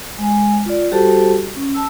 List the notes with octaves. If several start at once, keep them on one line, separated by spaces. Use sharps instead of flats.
G#3 G#5
F4 D5
G3 F#4 G4 A4 C5 A5
C#4
A5 E6